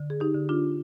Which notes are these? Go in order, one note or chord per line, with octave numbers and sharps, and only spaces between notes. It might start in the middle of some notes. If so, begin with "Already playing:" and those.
Already playing: D3
G#4
D#4 G4
D3
D4 F4